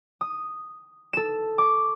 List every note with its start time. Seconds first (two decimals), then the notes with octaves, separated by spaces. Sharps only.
0.21 D#6
1.13 A4 E7
1.58 C#6 D6